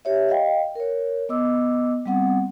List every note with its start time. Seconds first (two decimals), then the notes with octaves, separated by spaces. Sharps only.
0.05 G4 C#5 E5
0.29 D#5 F5 G5
0.75 A#4 C#5
1.29 B3 D#5 D6 E6
2.06 G3 B3 C4 F#5